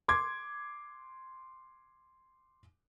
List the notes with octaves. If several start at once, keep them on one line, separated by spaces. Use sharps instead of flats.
C6 D6 G#6